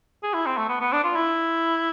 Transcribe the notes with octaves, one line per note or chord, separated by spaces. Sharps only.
G#4
E4
C4
A3
B3
B3
D4
F4
E4